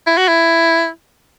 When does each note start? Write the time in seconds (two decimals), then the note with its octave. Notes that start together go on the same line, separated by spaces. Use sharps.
0.07 E4
0.17 F#4
0.28 E4